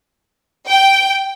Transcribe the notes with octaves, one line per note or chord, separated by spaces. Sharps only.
G5